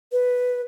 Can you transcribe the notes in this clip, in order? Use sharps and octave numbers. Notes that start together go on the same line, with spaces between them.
B4